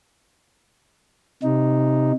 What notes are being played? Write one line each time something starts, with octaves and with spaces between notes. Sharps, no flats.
C3 D#4